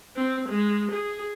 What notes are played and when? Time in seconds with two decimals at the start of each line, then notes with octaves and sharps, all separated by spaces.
0.16 C4
0.49 G#3
0.92 G#4